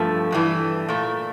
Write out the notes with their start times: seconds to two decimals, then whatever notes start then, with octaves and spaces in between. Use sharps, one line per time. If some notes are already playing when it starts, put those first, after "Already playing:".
Already playing: G2 F3 A3
0.32 G2 E3 A3
0.88 A#2 A3